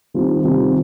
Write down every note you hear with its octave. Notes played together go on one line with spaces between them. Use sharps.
D#3 G3 C4 F4
C3 D#3 G3 C4 F4